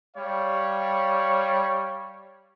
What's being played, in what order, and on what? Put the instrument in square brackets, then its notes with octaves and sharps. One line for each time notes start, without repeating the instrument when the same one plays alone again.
[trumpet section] G3 C#5 F5